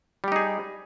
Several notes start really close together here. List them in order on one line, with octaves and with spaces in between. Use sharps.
G3 G4 D#4 G#4